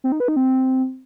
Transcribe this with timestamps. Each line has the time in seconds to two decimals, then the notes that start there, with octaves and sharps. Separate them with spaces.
0.04 C4
0.12 D#4
0.20 B4
0.28 D#4
0.36 C4